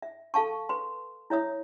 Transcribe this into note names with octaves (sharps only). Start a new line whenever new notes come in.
E5
A4 F5 A5 C#6
B4 C6
E4 C#5 E5 D#6